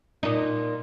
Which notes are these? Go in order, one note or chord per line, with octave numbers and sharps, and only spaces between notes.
A#2 D#4